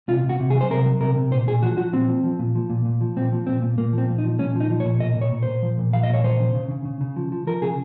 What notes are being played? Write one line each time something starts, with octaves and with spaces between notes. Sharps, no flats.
C3 F4
C3
F#4
C3
G#4
F#3
C5
C3 A#4
F#3
C3 A#4
C3
A#2 C5
A#2 G#4
F3 F#4
F3 F#4
A#2 C4
F3
F3
A#2
F3
A#2
A#2
F3
A#2 C4
F3
A#2 C4
A#2
A#2 A#3
F3
C4
A#2
D#4
F3
A#2 C#4
F3
D#4
F3
C#5
A#2
A#2 D#5
A#2 C#5
A#2
A#2 C5
F3
A#2
F3 F5
D#5
A#2 C#5
F3 C5
C#3
C#3
C#3
C#3
C#3
F3
F3
F3 A#4
C#3 G#4